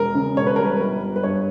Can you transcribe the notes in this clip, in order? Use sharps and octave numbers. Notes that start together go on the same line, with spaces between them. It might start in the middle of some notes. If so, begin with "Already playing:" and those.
Already playing: E1 A#4
C#3
E1 C#5
B4
G3 A#4
B4
G1
G1
B4
G2 C#5